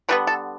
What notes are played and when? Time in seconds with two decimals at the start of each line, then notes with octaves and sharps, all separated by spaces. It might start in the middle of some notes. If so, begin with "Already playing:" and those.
0.09 D3 G3 B3 B4
0.27 A4